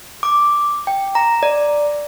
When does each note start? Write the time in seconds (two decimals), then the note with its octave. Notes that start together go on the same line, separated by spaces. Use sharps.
0.23 D6
0.87 G5
1.15 A#5
1.43 D5